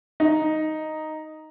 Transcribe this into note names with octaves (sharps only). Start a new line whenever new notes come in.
D#4